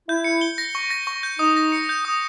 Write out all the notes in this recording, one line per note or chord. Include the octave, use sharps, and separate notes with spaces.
E4 G6
C#7
G7
A#6
C#6
A#6
C#6
G6
D#4 D#6
A#6
C#7
G6
D#6